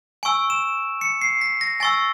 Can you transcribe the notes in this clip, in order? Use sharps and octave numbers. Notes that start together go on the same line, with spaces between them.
G#5 C#6 E6 D7
E7
C#7
C7
B6
A#6
G#5 C#6 E6 A6